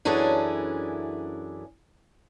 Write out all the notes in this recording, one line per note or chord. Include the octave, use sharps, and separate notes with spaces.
F#2 E3 C#4 D4 G#4 A4